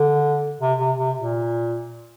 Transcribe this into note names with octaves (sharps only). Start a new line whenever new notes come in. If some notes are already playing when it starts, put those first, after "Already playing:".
Already playing: D3
C3
C3
C3
A#2